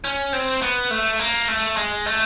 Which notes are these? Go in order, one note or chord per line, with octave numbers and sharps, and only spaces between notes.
C#4
C4
B3
A3
A#3
A3
G#3
A3